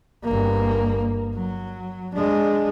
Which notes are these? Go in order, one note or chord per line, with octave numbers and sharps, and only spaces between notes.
G1 A#3
F#3
G#3 D4